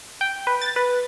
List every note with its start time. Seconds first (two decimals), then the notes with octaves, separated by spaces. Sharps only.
0.21 G5
0.47 B4
0.62 A6
0.76 B4